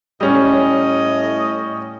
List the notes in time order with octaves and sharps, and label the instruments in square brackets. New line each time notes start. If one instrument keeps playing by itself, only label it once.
[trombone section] A2 [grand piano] G3 C#4 [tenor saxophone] D#5